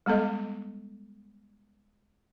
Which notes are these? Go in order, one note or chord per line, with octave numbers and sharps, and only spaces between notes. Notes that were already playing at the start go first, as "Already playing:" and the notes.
G3 G#3 B3 A4 D#5